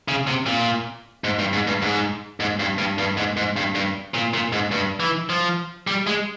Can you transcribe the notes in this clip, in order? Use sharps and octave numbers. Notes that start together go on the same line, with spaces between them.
C#3
C3
A#2
G#2
G2
G#2
G2
G#2
G#2
G2
G2
G2
G#2
G#2
G2
G2
A#2
A#2
G#2
G2
E3
F3
G3
G#3